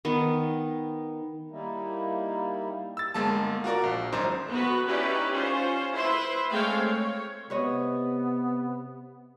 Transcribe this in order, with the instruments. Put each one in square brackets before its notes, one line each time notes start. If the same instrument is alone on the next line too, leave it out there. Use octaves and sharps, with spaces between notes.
[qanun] D#3 B3
[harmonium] G3 A#3 D#4 E4
[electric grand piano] E6 A6
G1 G#3 A#3 A5
F4 F#4 A#4 D5
A#1
G#1 F#2 D#4 C5 A#5
[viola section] B3 F#4 B4
C#4 D#4 E4 G4 B4 D5
C#4 F4 C5
E4 B4 C5 E5 C6
G#3 A3 C4 C#5 F5 G5
C#5
[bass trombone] C3 [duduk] B3 [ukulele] B4 C#5 D#5